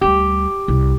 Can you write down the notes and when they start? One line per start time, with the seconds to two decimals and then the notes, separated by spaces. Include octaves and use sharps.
0.01 D2 G3 G4
0.68 C2